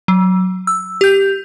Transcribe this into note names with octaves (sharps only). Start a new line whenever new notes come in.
F#3
E6
G4 G6